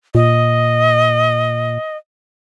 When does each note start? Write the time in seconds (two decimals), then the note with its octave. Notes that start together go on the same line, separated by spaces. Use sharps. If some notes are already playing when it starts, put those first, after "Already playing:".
0.15 A#2 D#5